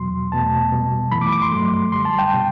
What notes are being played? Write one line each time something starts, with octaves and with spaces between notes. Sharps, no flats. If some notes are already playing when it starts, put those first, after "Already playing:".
Already playing: E2 B2 F#3 C6
E2 B2 A3 A5
B2 G3
F#2 E3 A3 B5
D6
D6
C6
G2 F#3 A3
F#2 D3 G3 C6
A5
G5
B2 G3